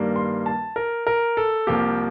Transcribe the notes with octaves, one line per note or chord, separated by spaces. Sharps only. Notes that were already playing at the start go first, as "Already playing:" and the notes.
Already playing: G2 D#3 G3 A#3
C6
A5
A#4
A#4
A4
C2 C3 F3 A#3 G4